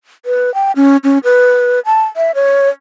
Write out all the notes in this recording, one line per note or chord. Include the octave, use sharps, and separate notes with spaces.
B4
G5
C#4
C#4
B4
A5
E5
C#5